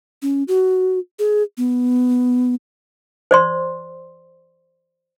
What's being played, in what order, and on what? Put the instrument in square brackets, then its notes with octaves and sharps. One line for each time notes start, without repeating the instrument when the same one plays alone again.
[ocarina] C#4
F#4
G#4
B3
[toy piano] C5 D5 C6